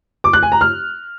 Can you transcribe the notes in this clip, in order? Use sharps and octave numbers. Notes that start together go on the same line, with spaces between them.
D6
F#6
G#5
A#5
F6